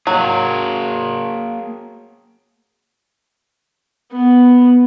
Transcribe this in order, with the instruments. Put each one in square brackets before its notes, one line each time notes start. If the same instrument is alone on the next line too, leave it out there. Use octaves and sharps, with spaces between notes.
[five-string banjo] F#3 [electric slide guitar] A#3 G#4
[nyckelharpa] B3